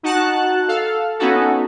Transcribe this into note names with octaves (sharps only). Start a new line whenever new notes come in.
D#4 F#4 F#5 A5 F#6
A4 F5
B3 C#4 D#4 F#4 A4